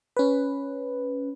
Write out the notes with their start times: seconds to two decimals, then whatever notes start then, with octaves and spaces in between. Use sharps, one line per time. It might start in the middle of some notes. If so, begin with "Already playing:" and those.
0.17 C#4 B4